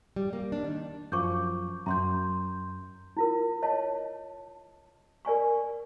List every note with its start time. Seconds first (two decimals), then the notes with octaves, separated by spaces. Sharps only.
0.16 G3
0.33 A#3
0.52 D4
0.64 D#3
1.12 F#2 F3 C#6 D6 G6
1.86 F#2 A#5 C6 G6
3.17 E4 F4 A#4
3.63 C#5 D#5 A5
5.25 A#4 D5 G#5 C#6